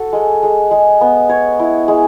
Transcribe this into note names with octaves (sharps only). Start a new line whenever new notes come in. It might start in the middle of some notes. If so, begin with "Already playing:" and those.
Already playing: F#4 A4
G#3
G#3
G#3
B3
C#5
E4
G#3